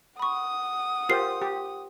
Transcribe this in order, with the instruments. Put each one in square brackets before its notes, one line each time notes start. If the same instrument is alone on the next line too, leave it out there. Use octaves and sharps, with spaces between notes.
[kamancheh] F#5 D#6 [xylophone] B5 C#6
[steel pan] F4 G4 C5 [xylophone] A#4 C7
[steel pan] G4